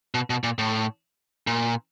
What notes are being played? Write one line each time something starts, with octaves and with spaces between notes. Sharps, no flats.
B2
B2
A#2
A2
A#2